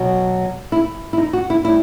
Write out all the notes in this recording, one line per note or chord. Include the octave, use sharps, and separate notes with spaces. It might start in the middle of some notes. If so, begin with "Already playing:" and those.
Already playing: B2 F#3
E4
E4
D#4
F#4
E4
A2 G3 E4